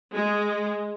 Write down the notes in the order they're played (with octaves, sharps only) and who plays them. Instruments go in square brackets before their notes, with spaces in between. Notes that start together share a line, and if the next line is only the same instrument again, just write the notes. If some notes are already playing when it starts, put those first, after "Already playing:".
[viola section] G#3